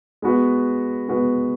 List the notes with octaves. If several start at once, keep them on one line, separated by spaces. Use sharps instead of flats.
G#3 B3 F#4 B4
G#3 B3 F#4 B4